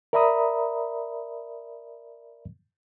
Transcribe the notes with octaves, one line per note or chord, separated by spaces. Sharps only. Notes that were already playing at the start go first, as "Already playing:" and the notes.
A#4 D5 E5 A#5 B5 D#6